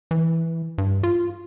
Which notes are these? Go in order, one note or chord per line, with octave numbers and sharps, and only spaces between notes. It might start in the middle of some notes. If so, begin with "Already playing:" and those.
E3
G2
F4